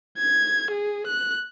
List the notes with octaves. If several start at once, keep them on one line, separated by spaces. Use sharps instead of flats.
G#6
G#4
F#6